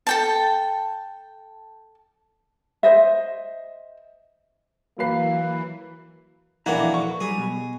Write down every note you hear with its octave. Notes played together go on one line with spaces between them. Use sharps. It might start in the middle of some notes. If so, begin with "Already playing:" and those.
A4 G5 A5
C5 D#5 E5
E3 F#3 A#3 B4 C7
B1 F2 E3 A#3 D4 F#4 F#5 A#5
C#6
F#3 G3 G#4
B2